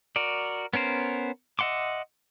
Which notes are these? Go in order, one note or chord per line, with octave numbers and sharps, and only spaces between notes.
F#4 A#4 D5
B3 C#4 A#4 C5
D#5 E5 F#5 C6 D6